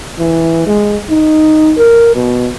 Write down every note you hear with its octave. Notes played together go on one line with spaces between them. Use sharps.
E3
G#3
D#4
A#4
B2